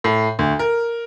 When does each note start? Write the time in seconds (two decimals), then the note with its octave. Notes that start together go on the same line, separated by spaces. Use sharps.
0.04 A2
0.39 D2
0.59 A#4